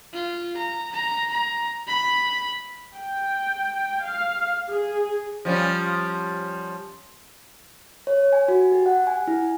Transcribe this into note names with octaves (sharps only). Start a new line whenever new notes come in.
F4
A#5
A#5
A#5
B5
G5
F5
G#4
F3 G3 C#4
C#5
G#5
F#4
G4
F#5
G#5
E4